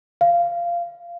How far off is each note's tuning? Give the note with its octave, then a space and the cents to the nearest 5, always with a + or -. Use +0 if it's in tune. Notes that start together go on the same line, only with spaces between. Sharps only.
F5 -15